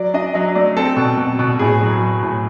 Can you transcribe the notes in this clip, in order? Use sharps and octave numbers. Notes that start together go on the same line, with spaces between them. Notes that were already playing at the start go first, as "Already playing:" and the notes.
Already playing: F#3 D5
D4 D#5
F#3 D#5
A3 D5
C4 A4
B2
B2
B2
A2 G#4
F#3
F#3
A2